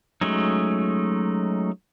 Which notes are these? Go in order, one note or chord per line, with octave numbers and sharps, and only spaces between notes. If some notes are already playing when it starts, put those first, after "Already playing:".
F#3 G#3 A3 C#4 D#4